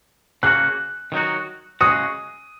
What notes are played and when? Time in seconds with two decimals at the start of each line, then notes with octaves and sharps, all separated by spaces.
0.43 C#3 A#3 C#4 F#4 F#6
1.12 D#3 F#3 D#4 F#4
1.81 C#3 G#3 C#4 F#4 D#6